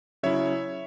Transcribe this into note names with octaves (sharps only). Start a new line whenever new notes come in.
C#3 F#3 C#4 E4 C#5 E5